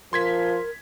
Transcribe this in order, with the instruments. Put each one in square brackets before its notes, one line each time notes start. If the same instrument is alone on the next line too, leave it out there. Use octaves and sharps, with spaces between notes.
[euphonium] F3 [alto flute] A#4 [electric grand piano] C6 G#6 B6